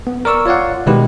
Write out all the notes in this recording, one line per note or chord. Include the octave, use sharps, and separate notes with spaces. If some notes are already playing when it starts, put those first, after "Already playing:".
B3
A#4 D5 C#6 E6
F4 C#5 D5 F5 F#5
B2 D#3 G#3 E4 G4 B4